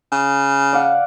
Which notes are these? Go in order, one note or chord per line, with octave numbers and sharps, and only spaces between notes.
C#3
D5 F5 F#5